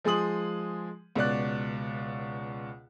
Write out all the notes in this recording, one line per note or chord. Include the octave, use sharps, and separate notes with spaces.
F3 G#3 G#4 C6 D#6 F#7
C#2 B2 D5 F#6